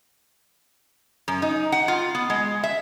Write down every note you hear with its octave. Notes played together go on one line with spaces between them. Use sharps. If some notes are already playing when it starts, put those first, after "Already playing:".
F#2
D#4
F#5
F4
B3
G#3
E5